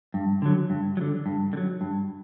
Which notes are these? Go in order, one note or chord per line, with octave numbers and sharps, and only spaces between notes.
G2
D3 F#3
G2
F#3
D3
G2
D3
F#3
G2